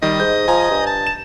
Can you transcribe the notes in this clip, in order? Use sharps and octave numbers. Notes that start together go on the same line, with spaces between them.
D#3 G3 D#5
G#2 G6
F3 G#5 A#5
G2
A5
E7